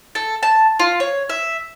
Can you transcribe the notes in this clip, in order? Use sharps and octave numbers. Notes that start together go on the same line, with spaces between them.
A4
A5
F4
C#5
E5